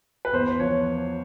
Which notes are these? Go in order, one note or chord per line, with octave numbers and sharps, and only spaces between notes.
B4
E2 C5
F3 C#5